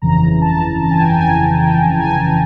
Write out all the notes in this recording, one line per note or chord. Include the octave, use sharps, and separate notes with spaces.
G1 F2 C#3 E3 A#5
A5
A5
G#5
G5
G#5
G#5
G5
G#5